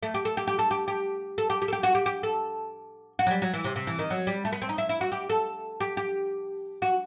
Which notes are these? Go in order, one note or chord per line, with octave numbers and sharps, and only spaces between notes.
A3
G4
A4
G4
G4
A4
G4
G4
A4
G4
G4
A4
G4
F#4
G4
G4
A4
F#4
F#3
G3
F#3
E3
C3
C3
E3
D#3
F#3
G3
A3
B3
C4
D#4
E4
E4
F#4
G4
A4
G4
G4
F#4